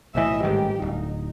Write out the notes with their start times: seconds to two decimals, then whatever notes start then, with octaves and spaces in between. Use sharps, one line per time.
0.15 B1 A2 E3 D#5 E5
0.43 A1 G#2 D#3 G3 G4
0.82 D1 D#4